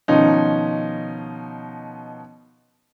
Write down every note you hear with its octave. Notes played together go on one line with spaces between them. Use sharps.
B2 D#3 F3 C#4 D#4